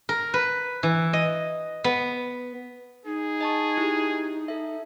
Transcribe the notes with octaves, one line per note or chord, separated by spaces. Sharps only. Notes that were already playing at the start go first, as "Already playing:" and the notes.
A#4
B4
E3
D#5
B3
D#4 G#4
D#5 A5 C#6
E4 G4
A4 E5